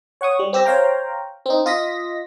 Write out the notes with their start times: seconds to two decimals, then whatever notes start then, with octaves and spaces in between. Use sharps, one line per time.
0.21 C#5 F#5 C#6 D#6
0.39 G3
0.53 C4 G4 E6 A#6
0.65 C5 C#5 F5 G5 A#5
1.46 C4 D#4
1.66 F4 D#5 A#6 B6